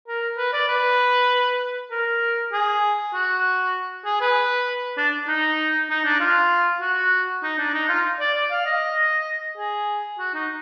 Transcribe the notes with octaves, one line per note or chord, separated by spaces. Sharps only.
A#4
B4
D5
B4
A#4
G#4
F#4
G#4
B4
D4
D#4
D#4
D4
F4
F#4
D#4
D4
D#4
F4
D5
D5
F5
D#5
G#4
F#4
D#4